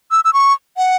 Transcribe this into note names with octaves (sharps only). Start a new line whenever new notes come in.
E6
E6
C#6
F#5